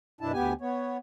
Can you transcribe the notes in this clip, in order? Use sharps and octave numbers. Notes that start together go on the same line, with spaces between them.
F#2 B2 D4 E4 A5
D2 B3 G4 G#5
B3 C#5